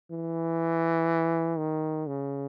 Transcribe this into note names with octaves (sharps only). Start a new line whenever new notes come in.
E3
D#3
C#3